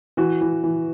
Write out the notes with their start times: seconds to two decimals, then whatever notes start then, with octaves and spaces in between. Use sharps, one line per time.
0.17 E3 F#4
0.41 E3
0.63 E3